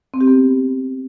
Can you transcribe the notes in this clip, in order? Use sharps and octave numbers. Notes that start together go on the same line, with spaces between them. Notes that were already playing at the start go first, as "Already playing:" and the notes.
C4
G4
B3